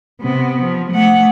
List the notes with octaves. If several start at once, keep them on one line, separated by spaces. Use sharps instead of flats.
C3 B3
F3
A3 F#5